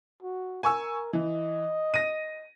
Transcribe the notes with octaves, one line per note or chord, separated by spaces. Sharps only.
F#4
A#4 G#5 C#6 E6
E3 D#5
A#6 D#7